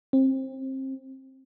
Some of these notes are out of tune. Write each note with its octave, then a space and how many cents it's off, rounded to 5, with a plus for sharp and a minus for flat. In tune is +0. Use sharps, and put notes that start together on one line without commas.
C4 +25